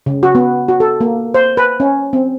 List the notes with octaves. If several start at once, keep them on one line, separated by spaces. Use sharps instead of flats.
C#3
F#4
B3
F#4
A4
A#3
C5
B4
C#4
C4